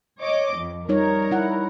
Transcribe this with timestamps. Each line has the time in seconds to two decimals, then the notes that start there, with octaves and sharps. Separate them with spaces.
0.21 C#5 D#5 D6
0.56 F2
0.89 G3 D#4 A#4 C#5
1.31 E4 F#5